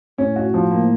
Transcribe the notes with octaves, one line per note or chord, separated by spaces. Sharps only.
A2 C#4
F#4
F3
A#3